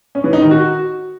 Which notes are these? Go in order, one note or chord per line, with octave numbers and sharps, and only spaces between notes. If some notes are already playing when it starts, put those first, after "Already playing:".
C#4
E3
D#4
D#3
F#4